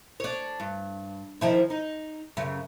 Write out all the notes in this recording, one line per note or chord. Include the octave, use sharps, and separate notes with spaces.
D4 C#5
G2
D#3 F3 E4
D#4
F#2 C#3